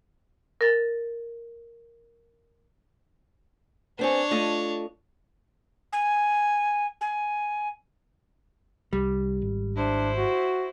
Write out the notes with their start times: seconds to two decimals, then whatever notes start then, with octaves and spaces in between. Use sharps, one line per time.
0.61 A#4 A6
3.99 B3 C4 D4 G#4 C#5
4.31 A3 F4 D#5
5.93 G#5
7.01 G#5
8.93 C2 G3
9.42 G#1
9.76 D4 E4 C5
10.15 F#4